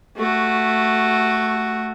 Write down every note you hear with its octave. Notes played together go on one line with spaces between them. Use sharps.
A3 F#4